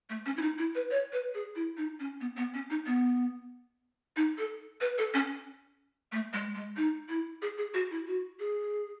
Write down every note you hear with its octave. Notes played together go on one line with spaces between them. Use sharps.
A3
C#4
E4
D#4
E4
B4
C#5
B4
G#4
E4
D#4
C#4
B3
B3
C#4
D#4
B3
D#4
A4
B4
A4
C#4
A3
G#3
G#3
D#4
E4
G#4
G#4
F#4
E4
F#4
G#4